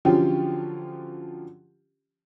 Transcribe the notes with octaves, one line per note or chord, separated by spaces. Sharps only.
D3 F3 F#3 C#4 F4 G4